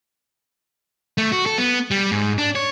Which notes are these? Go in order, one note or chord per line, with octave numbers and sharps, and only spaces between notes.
A3
F#4
A4
B3
G3
G#2
D4
C#5